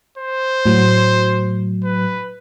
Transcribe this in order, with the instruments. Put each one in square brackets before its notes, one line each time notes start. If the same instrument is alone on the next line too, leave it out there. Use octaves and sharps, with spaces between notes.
[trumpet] C5
[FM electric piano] A2 F#3
[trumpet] B4